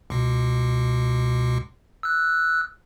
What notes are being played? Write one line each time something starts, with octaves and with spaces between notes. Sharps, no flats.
C#2 B2
E6 F#6